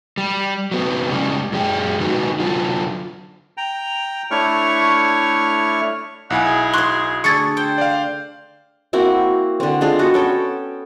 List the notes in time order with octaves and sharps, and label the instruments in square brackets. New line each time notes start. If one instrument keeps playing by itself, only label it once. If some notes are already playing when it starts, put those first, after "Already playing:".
[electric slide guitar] G3
F#3 B3 C4
C#3 G3 G#3 C#4
F#2 G#3 G4
D#3 G#3 B3 D#4 F#4
D3 F#3 F4
[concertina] G5 A#5
A3 D4 E4 C#5 C#6 F6
[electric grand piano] B1 E4 G#5 [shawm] F#5
[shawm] G#4
[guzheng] F#4 C5 [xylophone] C6 C#6 F#6
[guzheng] D3 A3 G#4 [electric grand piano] C#6 [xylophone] G#6 A6 C#7
[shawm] C5 [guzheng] G5
[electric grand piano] D5 F5
[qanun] A#3 C4 E4 F#4
D3 C4
G#3 C4 D4 F4
B3 F#4 A4
C#4 A4 G5